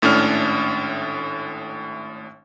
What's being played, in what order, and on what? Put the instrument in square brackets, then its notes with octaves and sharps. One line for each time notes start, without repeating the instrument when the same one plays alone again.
[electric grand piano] G#1 A2 C#4 D4 F6